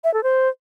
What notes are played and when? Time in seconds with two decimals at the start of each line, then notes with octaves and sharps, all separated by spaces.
0.04 E5
0.14 A4
0.23 C5